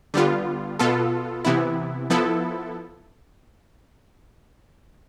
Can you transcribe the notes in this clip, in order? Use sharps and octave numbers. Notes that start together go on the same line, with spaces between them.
D3 G3 B3 F4
B2 B3 F4 A4
C3 E3 B3 E4
F3 B3 E4 A4